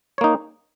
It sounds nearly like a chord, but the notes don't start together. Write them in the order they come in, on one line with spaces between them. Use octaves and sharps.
C#5 A#3 D#4